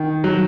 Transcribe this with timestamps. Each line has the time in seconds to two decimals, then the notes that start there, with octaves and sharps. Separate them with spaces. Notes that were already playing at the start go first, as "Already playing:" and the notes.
Already playing: D#3
0.24 F#3